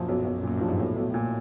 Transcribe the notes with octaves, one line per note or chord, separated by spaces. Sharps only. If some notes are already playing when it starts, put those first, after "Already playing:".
Already playing: F#2 A#2 F3
B1
B1
F#2 A#2
G2 F3
G#2
B1 A2
B1
A#2